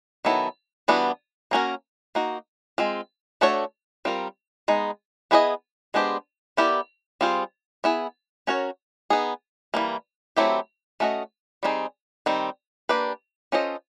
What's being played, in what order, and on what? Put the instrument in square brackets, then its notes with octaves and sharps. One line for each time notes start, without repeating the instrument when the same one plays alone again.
[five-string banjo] D#3 F#3 B3 E4 A4
E3 G3 B3 D4 F#4
A#3 C#4 F#4 A#4
A#3 D#4 F#4
G#3 C4 F4
A3 D4 F#4 A4 C#5
G3 C4 F4 A#4
G#3 B3 D#4
B3 E4 G#4 B4 D#5
G#3 B3 D4 G4 C5
B3 E4 G4 A#4 D5
G3 C4 F4 G#4 C5
B3 E4 G#4
C#4 F#4 A#4 C#5
B3 D#4 G#4
E3 G3 A#3
F#3 A3 C4 E4 G4
A3 C#4 F#4 A#4 D#5
G3 C4 D#4 G#4
D#3 G3 C4
A#3 D4 G4 B4
C#4 F4 A4 C5 D#5